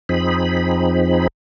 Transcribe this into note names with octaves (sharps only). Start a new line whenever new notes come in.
F2 F3 C4 D#4 G#4 B5